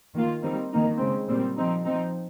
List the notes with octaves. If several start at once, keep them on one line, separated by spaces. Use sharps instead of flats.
D#3 A#3 F4
D#3 G3 C4 D#4
D#3 A#3 D#4
C#3 G#3 C4
A#2 G3 C4
F3 C4 D#4
F3 C4 D#4